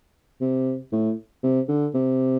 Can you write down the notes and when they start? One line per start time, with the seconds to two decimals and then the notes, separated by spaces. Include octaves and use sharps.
0.41 C3
0.92 A2
1.43 C3
1.68 D3
1.94 C3